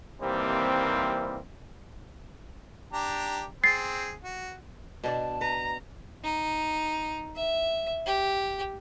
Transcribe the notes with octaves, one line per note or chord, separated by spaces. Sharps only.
D#2 C3 E3 G3 A#3 C4
D4 G4 A#5
C4 G#4 A6 C7
F#4
B2 D4 D5 A5
B4 A#5
D#4
E5
G4